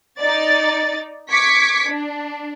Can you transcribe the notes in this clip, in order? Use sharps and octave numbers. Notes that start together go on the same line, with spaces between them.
D#4 D5 A6
C#6 D6 G#6 B6 C#7
D4